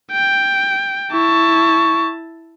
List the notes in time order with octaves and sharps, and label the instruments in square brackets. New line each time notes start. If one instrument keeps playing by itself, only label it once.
[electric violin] G5
[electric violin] E4 A5 [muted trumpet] C#6